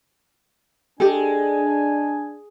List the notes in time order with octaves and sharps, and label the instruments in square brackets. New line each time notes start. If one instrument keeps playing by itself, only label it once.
[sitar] G#3 [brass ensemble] D4 G#5 [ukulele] G4 A4